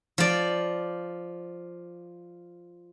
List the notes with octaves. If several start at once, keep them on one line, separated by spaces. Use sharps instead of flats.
F3 D5